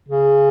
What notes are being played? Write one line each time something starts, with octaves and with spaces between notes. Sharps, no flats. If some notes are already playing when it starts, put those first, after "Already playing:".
C#3